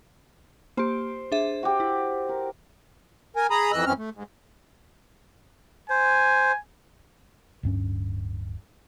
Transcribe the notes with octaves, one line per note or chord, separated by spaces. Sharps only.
A#3 G4 C5
D4 G#4 E5
F#4 G4
E4
A#4
A#4 G#5
G#4 A#5 B5 D#6
F2 E3 D#5 E6 F#6
F#2 E3 C4 C#4 F6
A3
G#2
C5 G#5
D1 G2 C#4